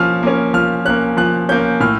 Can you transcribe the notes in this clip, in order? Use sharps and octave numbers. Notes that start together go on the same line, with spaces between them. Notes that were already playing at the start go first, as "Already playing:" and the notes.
Already playing: F3 A#3 C#4 F6
A#3 C#4
F3 F6
A#3 C#4 F#6
F3 F#6
A#3 C#4 G6
A2 F6